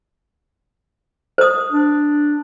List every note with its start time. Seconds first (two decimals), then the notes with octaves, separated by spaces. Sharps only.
1.38 C5 D#6
1.71 D4